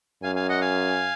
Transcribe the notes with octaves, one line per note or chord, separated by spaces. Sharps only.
F#2 F5 G#5
F5 G#5
D#5 F#5
F5 G#5